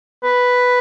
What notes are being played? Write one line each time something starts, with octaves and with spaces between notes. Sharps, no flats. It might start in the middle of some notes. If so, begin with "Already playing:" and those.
B4